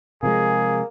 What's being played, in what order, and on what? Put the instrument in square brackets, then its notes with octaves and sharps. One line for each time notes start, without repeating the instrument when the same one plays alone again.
[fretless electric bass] C3 F3 G#3 [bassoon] A#3 [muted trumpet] G#4